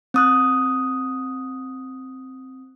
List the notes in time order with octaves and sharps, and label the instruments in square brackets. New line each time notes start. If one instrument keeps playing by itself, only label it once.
[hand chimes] C4 D#6 F#6